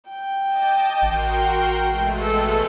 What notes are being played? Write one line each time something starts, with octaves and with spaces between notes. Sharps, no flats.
G5
D#5 A5 D6
A1 F#4 A#4 C6
B2 G#3 A3
A4